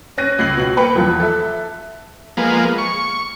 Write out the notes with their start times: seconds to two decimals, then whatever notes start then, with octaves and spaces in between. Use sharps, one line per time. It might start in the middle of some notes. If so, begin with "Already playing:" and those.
0.18 C#4 F#6 A#6 D#7
0.39 C#2 C7 F#7
0.57 B2 F#7
0.77 A#3 B4 G5 B5 C#7 F#7
0.95 E2 F3 F#6
1.20 A4 E5
2.37 F3 G#3 A#3 B3
2.78 C#6